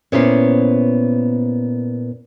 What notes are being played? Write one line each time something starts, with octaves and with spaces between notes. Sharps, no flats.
A#2 B3 C#4 E4 C5